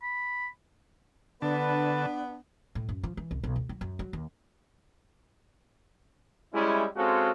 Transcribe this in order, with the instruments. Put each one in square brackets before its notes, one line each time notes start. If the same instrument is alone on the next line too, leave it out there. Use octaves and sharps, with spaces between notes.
[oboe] B5
[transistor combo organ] D3 A5 [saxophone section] B3 D4 [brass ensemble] B4
[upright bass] A2
F#2
F3
E3
C2
B1
D2
F#3
F#2
F#3
D#2
[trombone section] G3 G#3 C#4 E4
G#3 C4 C#4 F4 F#4 A4